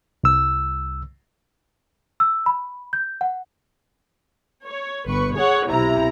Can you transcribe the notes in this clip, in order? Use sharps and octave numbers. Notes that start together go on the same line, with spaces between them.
C2 E6
E6
B5
G6
F#5
C#5
G1 B4 C#6
G#4 C#5 F#5
B1 C3 E4 A#5